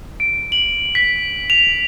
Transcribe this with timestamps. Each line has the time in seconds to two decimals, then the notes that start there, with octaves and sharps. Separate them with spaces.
0.20 D7
0.52 F#7
0.95 B6
1.50 F7